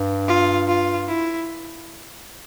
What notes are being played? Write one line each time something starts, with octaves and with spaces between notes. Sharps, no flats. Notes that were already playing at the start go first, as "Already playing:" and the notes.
Already playing: G2
F4
F4
E4